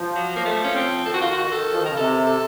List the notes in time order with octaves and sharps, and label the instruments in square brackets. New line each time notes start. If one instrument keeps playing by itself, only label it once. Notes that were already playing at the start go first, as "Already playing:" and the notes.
Already playing: [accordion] F3
[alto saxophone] F#3
A#3
A3
C#4
C4
[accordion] D#3 [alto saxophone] A4
[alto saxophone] F#4
F4
F#4
F#4
[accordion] D#3 [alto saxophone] A4
[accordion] F3
D#3
[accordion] C#3 [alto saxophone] A#4
[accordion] C3 [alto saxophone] A4
[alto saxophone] A4